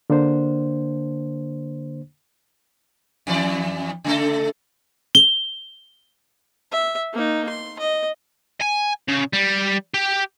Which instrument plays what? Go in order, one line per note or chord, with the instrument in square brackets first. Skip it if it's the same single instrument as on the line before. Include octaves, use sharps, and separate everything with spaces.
[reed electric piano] D3 A#3 D4 C5
[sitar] F2 E3 D5
C#3 A3 A4
[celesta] G7
[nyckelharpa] E5
A#3 D#4
C6
D#5
[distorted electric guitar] G#5
C#3
G3
G4